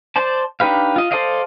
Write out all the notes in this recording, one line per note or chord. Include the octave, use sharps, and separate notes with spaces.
C5 D5 A5
D4 D#4 G4 B4 F5
F4 D#5
A4 C5 D5 D#5 F5